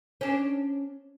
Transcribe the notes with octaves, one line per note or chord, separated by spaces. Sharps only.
C#4 D4